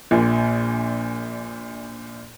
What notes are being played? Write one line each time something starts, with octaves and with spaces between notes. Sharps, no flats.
A#1 A#2